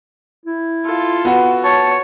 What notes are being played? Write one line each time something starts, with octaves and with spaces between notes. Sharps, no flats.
E4
F4 A4
B3 F#4
C#5 A5